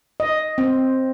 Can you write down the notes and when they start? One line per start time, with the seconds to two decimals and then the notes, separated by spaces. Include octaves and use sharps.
0.20 D#5
0.58 C4